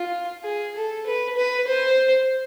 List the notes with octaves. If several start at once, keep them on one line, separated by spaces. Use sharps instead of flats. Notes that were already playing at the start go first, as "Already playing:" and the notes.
Already playing: F4
G#4
A4
B4
B4
C5